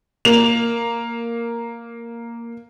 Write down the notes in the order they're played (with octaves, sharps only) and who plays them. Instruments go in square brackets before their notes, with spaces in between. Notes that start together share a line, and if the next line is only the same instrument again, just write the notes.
[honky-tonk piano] A#3 F7